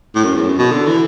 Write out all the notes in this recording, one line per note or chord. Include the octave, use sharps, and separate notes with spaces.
A2
F#2
E2
F#2
B2
D3
E3